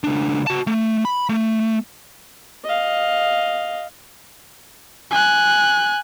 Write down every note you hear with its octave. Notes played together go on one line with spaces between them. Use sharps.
C#2 D4
F#4 A5
A3
B5
A3
D#5 F5
G#5 F#6